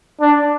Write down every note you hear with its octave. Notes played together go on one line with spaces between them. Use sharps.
D4